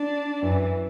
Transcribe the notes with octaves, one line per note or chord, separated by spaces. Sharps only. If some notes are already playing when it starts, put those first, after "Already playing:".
Already playing: D4
F#2 E3